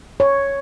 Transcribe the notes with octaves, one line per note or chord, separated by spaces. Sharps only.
C#5